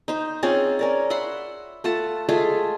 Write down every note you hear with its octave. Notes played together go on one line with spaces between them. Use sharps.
D#4 C5
C4 C#4 F4 G#4
C#4 A#4 D5
E5 F#5 B5 C6
A3 F4 F#5 A5
G#3 A3 F4 G#4